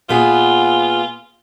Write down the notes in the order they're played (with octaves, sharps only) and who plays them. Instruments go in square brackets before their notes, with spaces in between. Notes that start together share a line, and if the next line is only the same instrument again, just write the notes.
[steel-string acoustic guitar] A#2 B3 G#4 [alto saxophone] F4